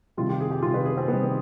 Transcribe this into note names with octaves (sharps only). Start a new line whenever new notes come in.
C3 D#3 G3 F4
G4
G#4
G4
C3 D#3 G3 F4
B4
G#4
C4
C3 D#3 G3 B3